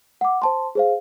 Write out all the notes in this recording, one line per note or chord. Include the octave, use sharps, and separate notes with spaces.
F#5 D6
C5 A5 C6
G#4 C5 F5